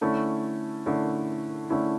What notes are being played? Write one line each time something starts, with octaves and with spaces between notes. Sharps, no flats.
D3 A3 C#4 E4
D3 A3 C#4 E4
D3 A3 C#4 E4